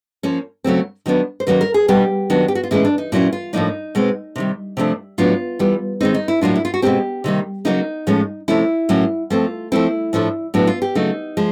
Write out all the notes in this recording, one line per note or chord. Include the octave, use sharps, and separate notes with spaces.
F3 A#3 C#4
C#3 F#3 A3 C4
D#3 F#3 B3 D4
C5
D#3 F#3 A#3 C#4 B4
A#4
G#4
B2 G3 B3 D4 G4
D#3 F#3 B3 D4
G4
F#4
F4
A2 E3 G#3 C#4 E4
D4
D#4
A#2 F#3 A#3 C#4 E4
F4
A2 F3 A#3 D4 D#4
B2 G#3 C4
C3 D#3 G3
C3 F3 A3 D4
A2 F#3 B3 D4 F4
E3 G3 B3
D#3 G#3 C4 D#4
D#4
E4
A2 F#3 A#3 D4 F4
E4
F4
F#4
B2 G#3 C4 G4
C3 D#3 G3 A#3
C#3 F#3 A#3 C#4 D#4
A2 F3 G#3 C#4
C3 F3 A3 C#4 E4
A2 F#3 A#3 C#4
F3 A3 C4 F4
F3 A3 C4 E4
A2 F3 A3 D4
A2 F#3 B3 D4
F4
G4
C#3 F#3 A3 D#4
F3 G#3